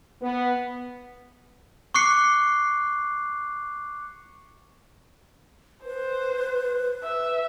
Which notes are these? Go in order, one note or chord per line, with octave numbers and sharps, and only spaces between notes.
B3
C#6 D6 F#6 C7 C#7
B4 C5
E5